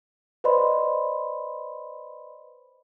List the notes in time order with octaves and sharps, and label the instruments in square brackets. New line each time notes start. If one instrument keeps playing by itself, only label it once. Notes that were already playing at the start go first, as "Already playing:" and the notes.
[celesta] B4 C5 D5 D#5 B5 C6